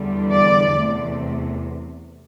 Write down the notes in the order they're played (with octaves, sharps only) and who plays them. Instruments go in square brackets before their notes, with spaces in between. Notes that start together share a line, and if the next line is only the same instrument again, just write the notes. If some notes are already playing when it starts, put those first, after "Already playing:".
Already playing: [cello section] E2 D3 G3
D5
E2 C3 A3